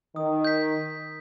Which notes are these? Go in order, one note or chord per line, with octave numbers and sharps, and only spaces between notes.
D#3 D#6
G6 B6